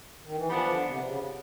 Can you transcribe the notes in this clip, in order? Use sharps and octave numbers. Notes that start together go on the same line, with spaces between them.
D#3
E3
F3 G3 B3 D4
D3
C3
C#3